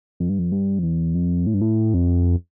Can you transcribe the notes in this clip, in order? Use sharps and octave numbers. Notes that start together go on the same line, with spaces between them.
F2
G2
F2
G2
F2
E2
F2
A2
G2
A2
F2